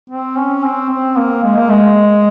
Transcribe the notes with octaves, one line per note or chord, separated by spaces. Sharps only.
C4
C#4
C4
C4
A#3
G#3
A#3
G#3